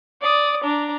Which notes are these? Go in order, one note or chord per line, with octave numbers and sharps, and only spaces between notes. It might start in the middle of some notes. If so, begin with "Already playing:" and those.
D5 D#6
D4 A#5